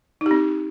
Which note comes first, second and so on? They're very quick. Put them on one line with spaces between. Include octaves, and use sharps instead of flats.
D#4 G4 C4